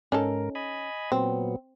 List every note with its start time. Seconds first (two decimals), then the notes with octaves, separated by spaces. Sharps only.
0.12 G#2 C#4 D#4 A4 A#4
0.55 D#5 G#5 B5
1.12 A#2 F#3 B3 C4